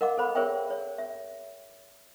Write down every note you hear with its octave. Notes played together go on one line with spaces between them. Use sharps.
A#4 D#5 F5 F#5 D6
A4 C5 B5
G#4 A#4 C5 C#5 E5 G5
C#5
E5